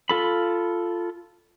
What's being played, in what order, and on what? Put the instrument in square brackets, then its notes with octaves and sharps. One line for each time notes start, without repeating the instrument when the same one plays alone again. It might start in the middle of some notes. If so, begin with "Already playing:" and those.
[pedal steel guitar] F4 A4 B5